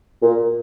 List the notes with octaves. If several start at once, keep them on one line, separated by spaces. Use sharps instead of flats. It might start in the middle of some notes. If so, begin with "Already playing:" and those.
A#2